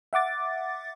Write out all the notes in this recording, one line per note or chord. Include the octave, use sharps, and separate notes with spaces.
E5 F#5 D6 A6